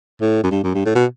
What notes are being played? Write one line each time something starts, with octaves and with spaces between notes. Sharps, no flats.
A2
F#2
G2
F#2
G2
A2
B2